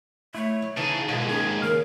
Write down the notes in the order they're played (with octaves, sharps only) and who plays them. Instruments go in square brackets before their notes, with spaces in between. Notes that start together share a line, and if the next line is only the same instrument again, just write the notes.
[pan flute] A3 [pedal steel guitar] E4 C#5
[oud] F#3
[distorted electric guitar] C#3 G#4 [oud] E3 [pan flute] D#4 [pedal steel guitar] A5
[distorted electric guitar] D#2 G#2 [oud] B2 F4 F#4 [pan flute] G#4
[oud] G#3 D#4 G#4 [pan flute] C#4 [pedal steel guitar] G#5
[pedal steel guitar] C#3 C#4 F5 [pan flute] A#4